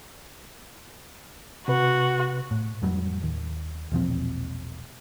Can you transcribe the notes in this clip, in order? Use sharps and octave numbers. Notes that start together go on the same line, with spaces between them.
C3 F#4 B4
A2
F2 A2 F#3 G3
D#2
E1 A#1 F3 C4